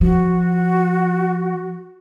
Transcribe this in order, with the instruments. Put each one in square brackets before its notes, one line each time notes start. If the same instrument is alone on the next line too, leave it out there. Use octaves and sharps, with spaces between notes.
[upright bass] F3 [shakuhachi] F#4